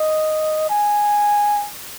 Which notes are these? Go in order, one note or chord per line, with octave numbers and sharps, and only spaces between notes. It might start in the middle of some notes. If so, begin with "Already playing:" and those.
Already playing: D#5
G#5